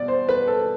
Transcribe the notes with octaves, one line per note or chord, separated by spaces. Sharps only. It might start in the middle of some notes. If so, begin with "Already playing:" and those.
Already playing: B2 D5
C5
B4
A4